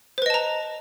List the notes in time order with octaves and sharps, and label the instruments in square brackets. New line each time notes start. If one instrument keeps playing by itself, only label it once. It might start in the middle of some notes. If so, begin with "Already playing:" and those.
[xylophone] C5
B4
D#5
A5
A#5